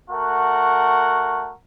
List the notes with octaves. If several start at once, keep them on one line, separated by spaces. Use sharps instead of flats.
A3 F#4 A#4 F#5